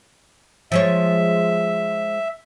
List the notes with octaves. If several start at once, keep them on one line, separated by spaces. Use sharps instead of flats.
F3 G#3 C#5 E5